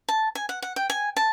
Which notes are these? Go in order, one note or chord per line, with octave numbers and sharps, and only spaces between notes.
A5
G#5
F#5
F#5
G5
G#5
A5